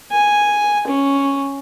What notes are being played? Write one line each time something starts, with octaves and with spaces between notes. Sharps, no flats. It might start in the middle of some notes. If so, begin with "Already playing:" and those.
G#5
C#4